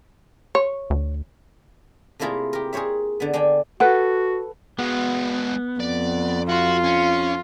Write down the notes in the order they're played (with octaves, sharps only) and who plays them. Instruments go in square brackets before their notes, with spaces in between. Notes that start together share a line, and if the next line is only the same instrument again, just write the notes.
[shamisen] C#5
[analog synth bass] D2
[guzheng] C3 A3 A#3 E4 F4 G#4
G4 A#4
G#4 A#4 C5 C#5 E5
D3 B3
D3 D4 D5 G5 G#5
[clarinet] F#4 [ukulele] A4 B4 [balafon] F#5
[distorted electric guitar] G#3 F#4 [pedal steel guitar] B3
[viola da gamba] F2 [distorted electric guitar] D5
[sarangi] F4 [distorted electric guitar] F#4
[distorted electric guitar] C#4